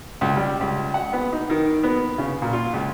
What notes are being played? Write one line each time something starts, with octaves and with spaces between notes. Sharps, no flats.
C#2
G3
C#2
F#5
B3
D#4
D#3
B3
C#3
A#2
F4
C#2